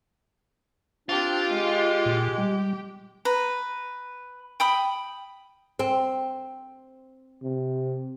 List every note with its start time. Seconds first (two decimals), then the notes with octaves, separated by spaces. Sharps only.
1.09 C4 D4 F4 G4
1.51 G#3
2.06 A#2
2.38 G3
3.25 B4 A#5
4.60 G5 B5 D#6
5.79 C4
7.42 C3